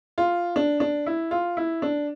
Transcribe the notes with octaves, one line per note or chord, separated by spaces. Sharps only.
F4
D4
D4
E4
F4
E4
D4